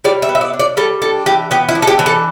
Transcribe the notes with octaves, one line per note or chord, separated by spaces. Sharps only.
G3 D5
E5
B3
E5
D5
D4
D5
G3 A4
D4 A4
E3 G4
B3 G4
E4
D4
A4
G4
E3
A4